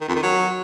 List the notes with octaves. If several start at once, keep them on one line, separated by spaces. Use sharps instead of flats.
D#3
F2
D#3
F#3